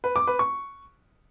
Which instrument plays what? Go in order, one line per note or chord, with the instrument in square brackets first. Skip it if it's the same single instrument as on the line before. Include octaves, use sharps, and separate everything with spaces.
[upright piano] B4
D6
B4
C#6